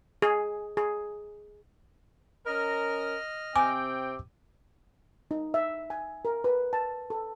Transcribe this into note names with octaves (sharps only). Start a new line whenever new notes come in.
G#4
G#4
C#4 A#4 D#5 F6
C3 C4 G5 G#5 D6
D#4
E5
G#5
A#4
B4
A5
A4